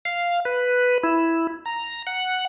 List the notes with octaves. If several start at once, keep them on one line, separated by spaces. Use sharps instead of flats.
F5
B4
E4
A#5
F#5